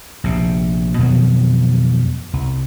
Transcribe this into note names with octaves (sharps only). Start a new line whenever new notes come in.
A#1 C3
F2 B2 D#3 F#3
C2